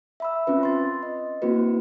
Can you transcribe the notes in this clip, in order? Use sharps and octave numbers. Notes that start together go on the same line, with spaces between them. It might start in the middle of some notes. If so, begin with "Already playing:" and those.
E5 B5 E6
C4 C#4 F4 B4
C6 A6
D#5
A#3 C4 E4 F#4 B4